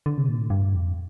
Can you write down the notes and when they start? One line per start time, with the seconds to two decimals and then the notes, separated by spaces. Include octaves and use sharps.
0.06 D3
0.18 C3
0.28 A#2
0.39 A2
0.50 G2
0.74 F2